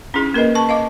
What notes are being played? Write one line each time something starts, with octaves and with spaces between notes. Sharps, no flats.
C#4 D#4 E4 G#4
A#3 A#4 B4 D#5
A5 C#6
D#5 F5 D6